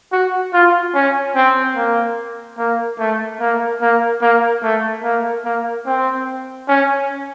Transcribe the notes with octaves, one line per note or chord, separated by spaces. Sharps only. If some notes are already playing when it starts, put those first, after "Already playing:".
F#4
F4
C#4
C4
A#3
A#3
A3
A#3
A#3
A#3
A3
A#3
A#3
C4
C#4